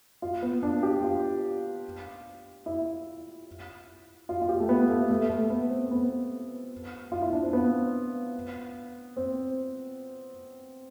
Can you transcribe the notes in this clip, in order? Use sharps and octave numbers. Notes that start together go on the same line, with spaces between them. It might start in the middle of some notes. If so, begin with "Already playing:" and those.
F4
B3
D4
G4
F4
E4
F4
F4
G4
A3
B3
A3
A3
A3
B3
C4
B3
F4
E4
D4
C4
B3
C4